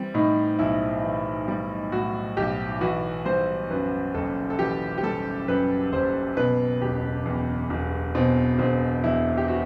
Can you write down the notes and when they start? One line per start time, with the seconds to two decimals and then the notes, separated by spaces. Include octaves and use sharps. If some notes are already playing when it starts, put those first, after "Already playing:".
Already playing: E3 G3 C4
0.14 A2 D#4
0.59 B1 E4
1.03 E3
1.48 G3
1.92 A2 F#4
2.37 B1 G4
2.81 E3 F#4
3.26 G3 C5
3.70 F#2 B4
4.14 F#1 A4
4.50 A4
4.59 E3 G4
4.98 G4
5.03 G3 A4
5.48 F#2 B4
5.92 F#1 C5
6.37 B2 B4
6.81 E1 G4
7.26 E2
7.70 E1
8.15 B2 C4
8.59 E1 C4
9.04 E2 E4
9.37 G4
9.48 F#4